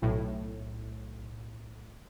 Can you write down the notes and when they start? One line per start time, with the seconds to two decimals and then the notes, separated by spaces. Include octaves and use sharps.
0.02 B1 A2